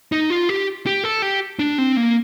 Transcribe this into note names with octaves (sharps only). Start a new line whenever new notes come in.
D#4
F4
G4
G4
A4
G4
D4
C4
A#3